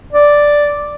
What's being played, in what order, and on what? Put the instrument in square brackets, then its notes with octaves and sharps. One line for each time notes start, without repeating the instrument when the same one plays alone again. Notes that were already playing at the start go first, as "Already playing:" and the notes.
[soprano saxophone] D5